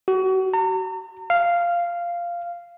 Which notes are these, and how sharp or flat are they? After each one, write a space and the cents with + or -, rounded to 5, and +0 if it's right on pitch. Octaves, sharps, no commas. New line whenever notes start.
F#4 +35
A#5 -40
F5 -10